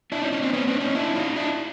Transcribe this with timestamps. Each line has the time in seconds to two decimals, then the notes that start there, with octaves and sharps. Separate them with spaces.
0.12 D4 E4
0.22 C#4 D#4
0.32 C#4 D#4
0.42 C4 D4
0.53 B3 C#4
0.67 C4 D4
0.80 C#4 D#4
0.95 D4 E4
1.15 D#4 F4
1.36 D4 E4